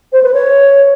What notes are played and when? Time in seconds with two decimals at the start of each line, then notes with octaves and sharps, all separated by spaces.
0.13 C5
0.23 B4
0.34 C#5